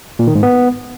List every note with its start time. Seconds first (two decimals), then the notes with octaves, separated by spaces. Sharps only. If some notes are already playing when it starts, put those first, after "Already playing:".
0.19 A#2
0.27 D#3
0.35 G#2
0.43 B3